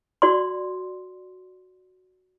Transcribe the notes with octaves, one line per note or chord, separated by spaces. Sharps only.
F#4 D5 C6